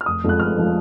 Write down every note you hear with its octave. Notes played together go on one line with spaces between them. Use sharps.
F6
F1 D#6
F2 F3 G#3 F#6
F1 F6
F3 G#3